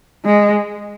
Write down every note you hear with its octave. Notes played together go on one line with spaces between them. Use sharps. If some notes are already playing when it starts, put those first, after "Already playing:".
G#3